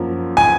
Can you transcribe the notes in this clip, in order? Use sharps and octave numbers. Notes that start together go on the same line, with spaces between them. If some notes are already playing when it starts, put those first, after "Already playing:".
Already playing: F#2 F3 A#3
G#5